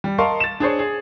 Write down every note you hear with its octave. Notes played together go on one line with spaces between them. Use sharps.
G3
A#4 D#5 F5 A5 C6 C#6
A6 E7
D4 G#4 C5 C#5
G#4